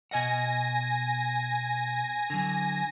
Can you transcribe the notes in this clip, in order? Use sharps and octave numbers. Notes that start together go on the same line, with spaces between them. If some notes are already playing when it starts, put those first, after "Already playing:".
B2 D#5 F#5 G#5 A#6
D3 F#3